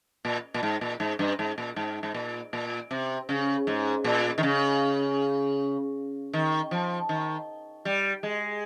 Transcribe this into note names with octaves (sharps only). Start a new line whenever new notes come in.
A#2
A#2
G#2
A#2
G#2
G2
G#2
A#2
G#2
G#2
A#2
A#2
C3
C#3
G#2
A#2
D#3
C#3
D#3
F3
D#3
G3
G#3